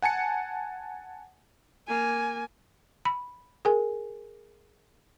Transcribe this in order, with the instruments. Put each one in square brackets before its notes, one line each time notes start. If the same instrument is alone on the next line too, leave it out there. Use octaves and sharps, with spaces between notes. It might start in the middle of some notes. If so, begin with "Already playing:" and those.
[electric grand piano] F#5 G#5 A5 C#7
[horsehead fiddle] A#3 G#5
[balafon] B5
G#4 A#4 G#5